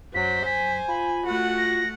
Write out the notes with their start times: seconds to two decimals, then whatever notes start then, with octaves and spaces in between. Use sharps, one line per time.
0.15 F#2 F#3 C5 B6
0.46 G#5 B6
0.88 F4 B5
1.26 A3 F#4 F#5
1.58 A#6